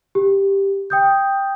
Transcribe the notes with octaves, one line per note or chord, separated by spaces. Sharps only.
G4
G5 D#6 G6